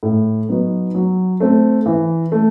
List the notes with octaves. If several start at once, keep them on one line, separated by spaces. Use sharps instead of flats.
A2
F#3 B3 D#4
F#3
A3 C4
E3
A3